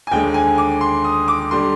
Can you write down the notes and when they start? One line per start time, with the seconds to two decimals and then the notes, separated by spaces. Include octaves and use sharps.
0.07 G#5
0.11 D#2 D3 G#3 G5
0.34 G#5
0.58 D6
0.81 C6
1.04 D#6
1.28 D6
1.51 D3 G3 C6